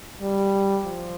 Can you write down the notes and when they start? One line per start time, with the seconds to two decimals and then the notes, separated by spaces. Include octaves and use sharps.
0.21 G3
0.84 F3